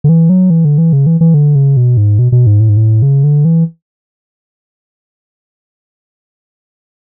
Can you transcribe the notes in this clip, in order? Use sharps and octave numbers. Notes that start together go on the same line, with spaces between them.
D3
E3
F#3
E3
D3
E3
C#3
E3
E3
D3
C#3
B2
G#2
B2
B2
G#2
A2
G#2
A2
C#3
D3
E3